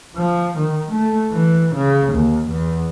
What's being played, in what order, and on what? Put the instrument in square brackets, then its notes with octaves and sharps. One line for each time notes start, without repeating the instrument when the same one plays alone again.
[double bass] F3
D#3
A3
E3
C#3
D#2
E2